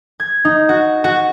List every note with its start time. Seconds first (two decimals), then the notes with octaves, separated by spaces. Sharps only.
0.20 G#6
0.45 D#4
0.69 F#4
1.04 F#4